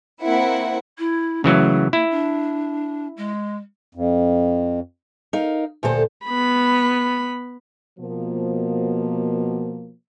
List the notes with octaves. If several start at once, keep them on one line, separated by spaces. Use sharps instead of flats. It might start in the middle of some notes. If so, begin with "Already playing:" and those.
A#3 C4 E4 F#5
E4
C#3 E3 F#3 A3
A#3 E4
D4
G#3
F2
D#4 A#4 F5
D2 A#2 G4 A4 C5
B3 B5
B2 F3 A#3